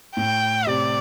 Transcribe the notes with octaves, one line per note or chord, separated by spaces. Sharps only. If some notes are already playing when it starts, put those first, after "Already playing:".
A2 G5
C3 D5